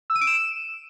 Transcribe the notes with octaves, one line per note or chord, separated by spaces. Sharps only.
E6
D#7
D7
E7